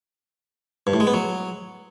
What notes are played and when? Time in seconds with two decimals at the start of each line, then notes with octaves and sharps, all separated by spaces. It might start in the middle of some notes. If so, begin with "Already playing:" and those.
0.87 G2
0.94 A2
1.00 G#3
1.07 B3
1.14 F#3